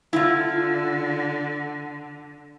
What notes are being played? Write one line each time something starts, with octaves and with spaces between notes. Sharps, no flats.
D3 E4 F4